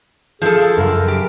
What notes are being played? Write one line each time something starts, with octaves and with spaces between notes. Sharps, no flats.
F3 G#4 A4 E5 F5
F#2 C#3 G#4 A#4
G4